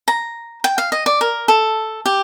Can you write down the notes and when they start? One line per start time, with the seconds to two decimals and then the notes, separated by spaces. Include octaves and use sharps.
0.08 A#5
0.64 G5
0.78 F5
0.92 D#5
1.06 D5
1.21 A#4
1.48 A4
2.06 G4